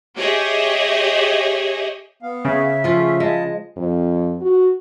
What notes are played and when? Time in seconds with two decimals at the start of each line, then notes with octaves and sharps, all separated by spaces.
0.16 G4 G#4 C#5 D#5 E5
2.23 B3 F5
2.45 C#3 E5
2.84 F3 A3 C#4 F4
3.20 C#3 G#3 A5
3.77 F2
4.41 F#4